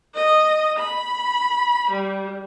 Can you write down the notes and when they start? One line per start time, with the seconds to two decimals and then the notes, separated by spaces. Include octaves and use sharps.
0.14 D#5
0.78 B5
1.90 G3